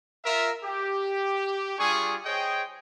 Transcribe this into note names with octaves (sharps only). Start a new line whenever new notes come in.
F4 A#4 E5
G4
G3 D4 F4 G#4 G#5 C#6
G#4 C5 C#5 D#5 G5